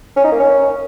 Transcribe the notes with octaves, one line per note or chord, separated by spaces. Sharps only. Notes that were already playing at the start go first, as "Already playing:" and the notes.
C#4
D#4
A#3
C#4